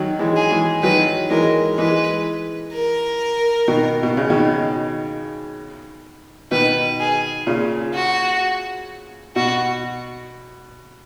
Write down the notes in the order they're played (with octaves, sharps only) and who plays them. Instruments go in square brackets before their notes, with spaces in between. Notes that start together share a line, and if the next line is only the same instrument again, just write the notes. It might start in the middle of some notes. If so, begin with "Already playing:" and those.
Already playing: [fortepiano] D#3 F#3
E3 G#3
[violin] G#4
[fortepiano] E3 G#3
[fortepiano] D#3 F#3 [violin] B4
[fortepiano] E3 G#3 [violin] A#4
[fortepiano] E3 G#3 [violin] B4
[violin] A#4
[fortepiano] B2 D#3
B2
C#3
B2 D#3
[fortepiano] B2 D#3 [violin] B4
[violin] G#4
[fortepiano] A#2 C#3
[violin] F#4
[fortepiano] B2 [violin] F#4